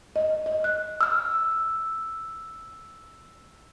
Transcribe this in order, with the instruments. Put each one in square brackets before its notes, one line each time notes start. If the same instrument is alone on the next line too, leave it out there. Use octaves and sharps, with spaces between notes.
[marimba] D#5
D#5
F#6
[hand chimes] E6 F6